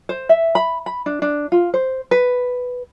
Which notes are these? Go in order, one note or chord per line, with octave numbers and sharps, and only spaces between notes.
C5
E5
B5
B5
D4
D4
F4
C5
B4